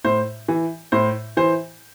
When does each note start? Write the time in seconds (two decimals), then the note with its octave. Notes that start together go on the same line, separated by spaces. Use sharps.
0.04 A2 C5
0.48 E3
0.92 A2 C5
1.37 E3 C5